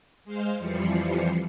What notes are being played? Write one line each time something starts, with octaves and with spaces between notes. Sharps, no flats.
G#3 C5 F5
F2 E3 F3 G3 C7 C#7